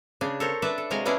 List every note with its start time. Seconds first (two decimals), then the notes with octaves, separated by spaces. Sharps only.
0.21 C#3 D4 G#4
0.40 A4 A#4 C5 C#5
0.62 D4 B4 D5 E5 A5
0.78 A4
0.90 C3 F#3 G#3 F5 G#5 A#5
1.05 B3 C#4 D4 E4 G#4 D5